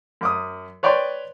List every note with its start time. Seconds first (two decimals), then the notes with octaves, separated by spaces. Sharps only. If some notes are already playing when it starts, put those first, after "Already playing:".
0.21 F#2 D6 D#6
0.83 B4 C#5 D5 G5 C6